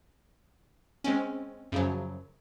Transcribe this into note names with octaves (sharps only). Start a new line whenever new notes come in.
G#3 C4 C#4
F#2 C#3 F3 F#3